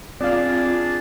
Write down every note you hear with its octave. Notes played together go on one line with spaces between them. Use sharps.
C4 D4 F4 G#4 D5 F5 A5